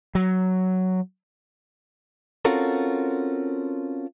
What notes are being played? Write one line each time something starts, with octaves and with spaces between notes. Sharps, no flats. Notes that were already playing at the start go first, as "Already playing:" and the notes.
F#3
C4 C#4 F4 F#4 A4 A#4